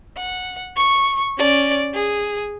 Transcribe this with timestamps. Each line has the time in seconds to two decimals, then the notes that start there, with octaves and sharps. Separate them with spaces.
0.17 F#5
0.76 C#6
1.38 C#4 D5
1.94 G#4